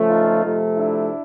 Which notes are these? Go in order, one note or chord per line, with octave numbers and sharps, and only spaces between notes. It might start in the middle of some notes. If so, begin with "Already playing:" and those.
Already playing: C#3 F3 A3
D#4 F4
C3 F3 A3
D4 E4